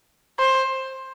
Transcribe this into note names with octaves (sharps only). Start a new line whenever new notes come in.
C5